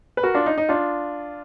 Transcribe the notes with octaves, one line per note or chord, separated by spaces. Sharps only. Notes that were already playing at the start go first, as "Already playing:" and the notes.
B4
F#4 A#4
D4 F4
D#4
D#4
D4 F4